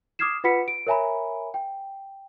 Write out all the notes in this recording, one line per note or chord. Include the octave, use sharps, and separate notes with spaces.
D6 D#6 F6 G#6 C7 E7
F4 B4 F#5 B5 B6 C#7
D7
A#4 C#5 E5 G#5 A#5 B5
G5